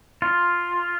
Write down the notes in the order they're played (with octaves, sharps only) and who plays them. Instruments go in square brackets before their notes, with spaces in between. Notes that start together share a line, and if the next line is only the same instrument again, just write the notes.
[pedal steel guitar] F4